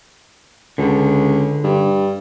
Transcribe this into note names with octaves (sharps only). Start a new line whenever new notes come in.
C#2 D3
G2